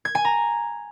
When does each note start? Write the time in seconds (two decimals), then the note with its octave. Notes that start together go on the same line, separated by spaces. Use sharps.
0.05 G#6
0.15 G#5
0.25 A#5